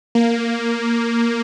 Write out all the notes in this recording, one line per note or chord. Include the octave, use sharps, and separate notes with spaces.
A#3